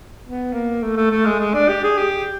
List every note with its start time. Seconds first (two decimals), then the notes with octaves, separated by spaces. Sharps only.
0.25 B3
0.53 A#3
0.83 A3
0.97 A3
1.11 A3
1.26 G#3
1.40 G#3
1.54 D4
1.69 G4
1.84 G#4
1.98 G4